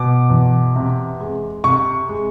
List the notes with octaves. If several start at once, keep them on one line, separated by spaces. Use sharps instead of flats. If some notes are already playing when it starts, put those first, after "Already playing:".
Already playing: B2 D6
E2
C3
G#3
C3 C#6
G#3